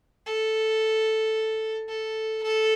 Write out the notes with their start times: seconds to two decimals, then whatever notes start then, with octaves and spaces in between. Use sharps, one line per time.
0.26 A4
1.89 A4
2.43 A4